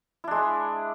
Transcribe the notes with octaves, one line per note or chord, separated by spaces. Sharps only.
G#3 D4 E4